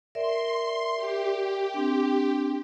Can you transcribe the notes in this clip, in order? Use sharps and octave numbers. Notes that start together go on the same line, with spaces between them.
A#4 D5 E5 C6
G4
C4 D4